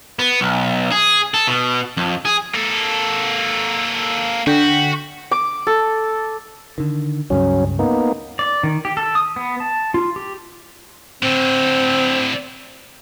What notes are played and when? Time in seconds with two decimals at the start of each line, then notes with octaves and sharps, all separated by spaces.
0.19 B3
0.41 B1
0.91 G#4
1.34 A4
1.47 B2
1.97 F2
2.25 G#4
2.55 A#3 A4
4.47 D3 F#4 G5 B6
5.31 D6
5.67 A4
6.78 D3 D#3
7.30 C#2 G2 C#3 F#3 C#4
7.79 A#3 B3 D#4
8.39 D5
8.63 D#3
8.85 G4
8.97 A4
9.15 D#6
9.36 B3
9.60 A5
9.94 F4
10.16 G4
11.23 A2 D3 C4